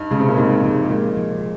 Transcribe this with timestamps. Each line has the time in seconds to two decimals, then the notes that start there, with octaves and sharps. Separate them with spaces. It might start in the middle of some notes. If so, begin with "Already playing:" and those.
Already playing: G2 D#4
0.11 C#3 G#3
0.20 C3
0.28 A#2
0.38 G#2 G4
0.64 F3
0.90 A#2 G#3
1.17 F3